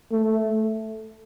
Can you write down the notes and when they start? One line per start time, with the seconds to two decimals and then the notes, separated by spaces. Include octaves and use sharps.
0.12 A3